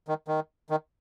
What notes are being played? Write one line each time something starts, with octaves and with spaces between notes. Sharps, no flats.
D#3
D#3
D#3